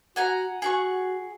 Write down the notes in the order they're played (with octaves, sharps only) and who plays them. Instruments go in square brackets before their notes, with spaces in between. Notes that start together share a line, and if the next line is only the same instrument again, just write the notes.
[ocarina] F#4 [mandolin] F#5 G#5 A#5
[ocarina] F#4 [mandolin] G#4 F#5 C#6